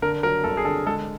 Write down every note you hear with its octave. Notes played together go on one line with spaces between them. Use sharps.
D3 A#4
F#3 A#4
G1 A4
G#4
D3 A4
G#3 A4